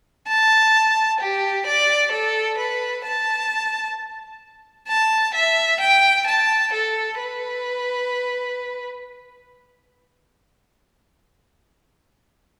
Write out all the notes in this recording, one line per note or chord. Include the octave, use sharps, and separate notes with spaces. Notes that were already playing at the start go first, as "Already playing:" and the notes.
A5
G4
D5
A4
B4
A5
A5
E5
G5
A5
A4
B4